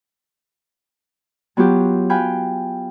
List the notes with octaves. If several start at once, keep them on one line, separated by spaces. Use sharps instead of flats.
F#3 B3 F4 G4
F5 G5 G#5 B5 F#6